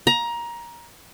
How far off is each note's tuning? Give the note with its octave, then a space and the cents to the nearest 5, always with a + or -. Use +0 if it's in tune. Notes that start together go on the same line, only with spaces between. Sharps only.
A#5 +20